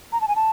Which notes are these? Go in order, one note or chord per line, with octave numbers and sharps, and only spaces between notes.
A#5
A5
G#5
A5